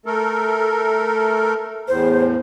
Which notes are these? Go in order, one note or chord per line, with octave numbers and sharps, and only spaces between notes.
A3 A4 A#4
E2 A2 C5